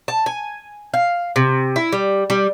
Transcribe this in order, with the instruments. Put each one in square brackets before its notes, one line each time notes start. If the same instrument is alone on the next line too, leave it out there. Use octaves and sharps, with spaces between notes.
[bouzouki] A5
G#5
F5
C3
E4
G3
G3